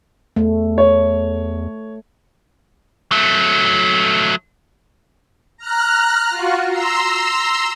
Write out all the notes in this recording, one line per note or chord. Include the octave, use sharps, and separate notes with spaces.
E2 A3
C#5
F#3 A3
A#5 F6 F#6
F4 F#4
A#5 C6 E6